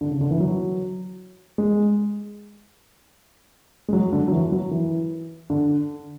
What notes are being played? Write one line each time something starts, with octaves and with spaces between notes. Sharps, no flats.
D3
C#3
D3
E3
F#3
G#3
G#3
F#3
D3
F#3
E3
F#3
E3
D3